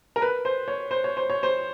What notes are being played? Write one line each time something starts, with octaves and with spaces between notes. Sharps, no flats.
A#4
B4
C5
C#5
C5
C#5
C5
C#5
C5